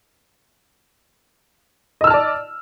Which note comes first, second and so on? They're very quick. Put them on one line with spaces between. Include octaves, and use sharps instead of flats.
D#5 E6 F6 A5 D5